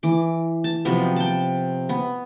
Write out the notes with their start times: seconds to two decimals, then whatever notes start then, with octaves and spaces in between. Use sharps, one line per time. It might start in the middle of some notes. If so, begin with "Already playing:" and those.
0.03 E3 D6
0.64 A5
0.85 C3 F3 F#3 B3
1.16 G5 A5
1.89 B3